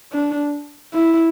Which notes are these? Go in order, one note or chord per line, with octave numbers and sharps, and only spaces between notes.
D4
E4